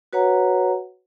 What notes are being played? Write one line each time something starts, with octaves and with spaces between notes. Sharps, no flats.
F#4 B4 C#5 F#5 A#5